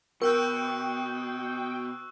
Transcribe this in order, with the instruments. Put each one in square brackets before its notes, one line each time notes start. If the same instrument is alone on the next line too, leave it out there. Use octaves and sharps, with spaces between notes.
[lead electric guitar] B2 [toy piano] A#4 [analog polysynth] G5 [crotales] C#6 E6 F#6